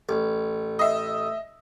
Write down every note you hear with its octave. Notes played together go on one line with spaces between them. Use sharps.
A1
D#5 E5